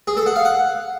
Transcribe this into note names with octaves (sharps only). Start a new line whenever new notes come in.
G#4
A4
F#5
F5
F#5